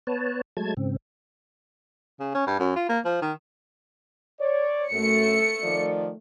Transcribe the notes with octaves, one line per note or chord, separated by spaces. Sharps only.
B3 B4 C#5 A5
F#3 G#3 A3 A5 G#6
G#2 C#3 C4
C#3
C#4
G2
F#2
F4
A#3
F3
D#3
C#5 D5
F#2 A3 C#7
D#3 F3 D5